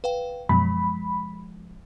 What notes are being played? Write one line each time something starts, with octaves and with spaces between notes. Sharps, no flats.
B4 F5 G5
F#2 B2 F3 G#3 B5